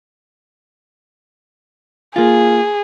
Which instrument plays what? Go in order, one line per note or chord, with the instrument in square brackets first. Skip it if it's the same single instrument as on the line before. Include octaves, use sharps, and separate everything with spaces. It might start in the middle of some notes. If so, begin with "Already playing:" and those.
[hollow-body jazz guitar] A#3 F4 [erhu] G#4